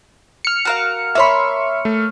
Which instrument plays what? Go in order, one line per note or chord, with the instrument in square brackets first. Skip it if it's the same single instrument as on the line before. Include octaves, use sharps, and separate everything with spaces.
[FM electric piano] F6 C#7
[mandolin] F#4 A#4 F5
[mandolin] A#3 C#5 B5 [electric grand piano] E5 C6
[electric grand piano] A3